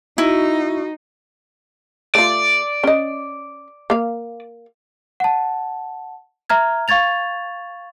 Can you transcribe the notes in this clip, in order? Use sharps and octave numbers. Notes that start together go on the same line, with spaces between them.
D#4 E4 F#4
A3 F4 D5
C#4 D#5
A#3 F5
F#5 A5
E5 A#5 F6 G#6
F5 C#6 G#6 A6 F7